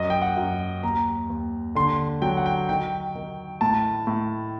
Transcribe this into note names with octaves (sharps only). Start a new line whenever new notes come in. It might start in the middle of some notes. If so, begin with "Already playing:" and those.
Already playing: F#2 D#5
G5
F#5
F#2
D#2 A#5
D#2
D3 C6
F#3 G5
F#5
G5
D#3 G5
D#3
A2 A5
A2